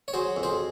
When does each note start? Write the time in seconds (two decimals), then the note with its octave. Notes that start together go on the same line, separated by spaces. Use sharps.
0.08 C#5
0.14 F#3 G#4 C5
0.36 F2
0.43 G#4 C5